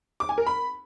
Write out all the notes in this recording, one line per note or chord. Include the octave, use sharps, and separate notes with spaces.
D6
G#5
A#4
B5